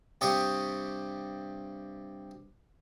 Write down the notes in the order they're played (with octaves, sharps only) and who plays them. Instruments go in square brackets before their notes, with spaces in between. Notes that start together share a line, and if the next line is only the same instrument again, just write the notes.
[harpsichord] G2 C3 G4 C#6 D#6